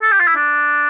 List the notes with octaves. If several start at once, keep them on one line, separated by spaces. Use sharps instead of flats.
A4
G4
F4
E4
D4